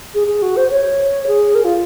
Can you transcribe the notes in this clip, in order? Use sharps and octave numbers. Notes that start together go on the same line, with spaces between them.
G#4
G#4
F#4
C5
C#5
G#4
A#4
F4